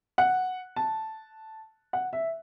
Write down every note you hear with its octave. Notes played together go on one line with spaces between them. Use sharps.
F#5
A5
F#5
E5